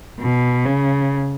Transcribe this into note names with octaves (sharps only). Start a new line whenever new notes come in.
B2
C#3